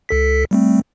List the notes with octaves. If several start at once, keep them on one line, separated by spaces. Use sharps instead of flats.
C#2 A4 B6
G3 A3 C4